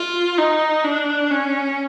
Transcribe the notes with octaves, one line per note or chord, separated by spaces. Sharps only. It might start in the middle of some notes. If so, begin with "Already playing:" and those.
Already playing: F4
D#4
D4
C#4